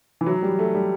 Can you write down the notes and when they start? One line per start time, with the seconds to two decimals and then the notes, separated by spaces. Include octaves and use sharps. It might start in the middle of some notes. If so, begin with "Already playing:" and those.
0.21 E3
0.26 F#3
0.42 G3
0.59 A3
0.75 G3